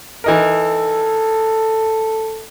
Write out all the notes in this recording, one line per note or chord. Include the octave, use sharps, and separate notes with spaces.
E3 D#4 A4 A#4